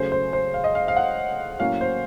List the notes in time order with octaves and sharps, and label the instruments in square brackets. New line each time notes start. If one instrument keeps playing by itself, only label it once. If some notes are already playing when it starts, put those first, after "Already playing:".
Already playing: [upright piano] C#3 F#3 A3 C#4 C5
C5
C5
F5
D#5
F5
F5
F#5
A2 F#3 A#3 C#4 F5
C5